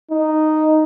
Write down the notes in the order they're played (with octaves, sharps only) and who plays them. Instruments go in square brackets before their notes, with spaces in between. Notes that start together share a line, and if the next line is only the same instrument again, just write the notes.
[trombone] D#4